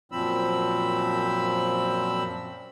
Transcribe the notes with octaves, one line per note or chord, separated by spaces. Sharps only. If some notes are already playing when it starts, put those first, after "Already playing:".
F#2 A#2 F3 C4 B5 E6